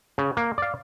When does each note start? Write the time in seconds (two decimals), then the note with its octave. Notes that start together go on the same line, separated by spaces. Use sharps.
0.18 C#3
0.37 A#3
0.58 D5 F5